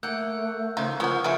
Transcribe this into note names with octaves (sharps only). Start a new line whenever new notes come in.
A3 A#3 F#5 E6 F#6 G6
C#3 E3 F3 D#4
C#3 E3 F3 G#3 A#4 F#5 C#6 F6
D3 F3 B3 G#4 E5 C#7 D7